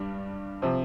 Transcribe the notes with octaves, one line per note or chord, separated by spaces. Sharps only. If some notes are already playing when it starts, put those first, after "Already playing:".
Already playing: G2 G3 D4
C3 F3 C4